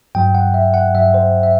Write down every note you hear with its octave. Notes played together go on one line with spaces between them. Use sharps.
G2 F#3 G5
F#5
E5
F#5
G2 F#3 E5
C5
E5